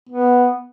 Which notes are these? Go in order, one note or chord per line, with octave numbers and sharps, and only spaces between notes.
B3